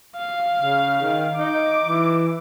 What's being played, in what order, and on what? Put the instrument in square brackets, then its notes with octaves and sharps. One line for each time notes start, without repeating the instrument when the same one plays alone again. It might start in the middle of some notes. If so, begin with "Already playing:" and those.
[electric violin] F5
[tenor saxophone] C#3
D#3
[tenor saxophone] D#4 [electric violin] D6
[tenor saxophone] E3